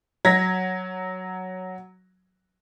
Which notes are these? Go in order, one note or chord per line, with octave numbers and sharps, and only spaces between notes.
F#3 G#6 A#6 B6